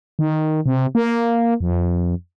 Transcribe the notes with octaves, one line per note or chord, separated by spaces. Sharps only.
D#3
C3
A#3
F2